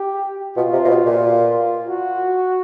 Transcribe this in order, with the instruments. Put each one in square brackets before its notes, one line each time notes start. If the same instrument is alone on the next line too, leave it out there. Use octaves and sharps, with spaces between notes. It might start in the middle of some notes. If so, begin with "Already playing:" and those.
Already playing: [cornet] G4
[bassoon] B2 [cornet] F4
[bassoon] C3
C3
B2
A#2
[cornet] F4
F#4